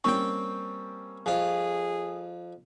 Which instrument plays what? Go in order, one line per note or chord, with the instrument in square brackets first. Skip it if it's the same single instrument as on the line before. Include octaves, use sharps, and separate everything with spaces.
[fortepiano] G3 A#3 C#4 [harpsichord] C4 G5 [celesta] C#6
[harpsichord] F2 F4 [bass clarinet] G#4